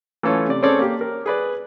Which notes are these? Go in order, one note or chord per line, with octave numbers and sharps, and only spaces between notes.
E3 A3 C#4 F4 A4 C#5
C3 D5
C4 C#4 G#4 A4 C#5 D5
A#3 G4
A#4
G#4 B4 D5